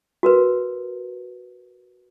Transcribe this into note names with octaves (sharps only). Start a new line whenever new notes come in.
F#4 A#4 B4